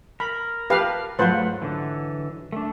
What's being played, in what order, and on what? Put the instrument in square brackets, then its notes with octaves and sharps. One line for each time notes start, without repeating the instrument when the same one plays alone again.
[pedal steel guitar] A#4 [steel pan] B5
[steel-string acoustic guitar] F4 A5 [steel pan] G4 B4 F5
[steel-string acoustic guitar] G#2 F#3 [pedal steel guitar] A3 F#5 [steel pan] F4 B4 C5
[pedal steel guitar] D3 E3
A3 D4